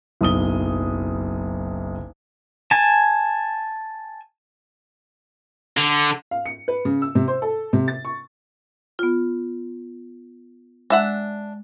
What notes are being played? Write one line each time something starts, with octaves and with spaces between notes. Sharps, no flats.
F#1 B1 D#6 G7
G#5 A5
D3
F5
C#7
B4
C#3
E6
C3
C5
A4
C3
A6
C#6
B3 F4
G#3 D4 E5 F#5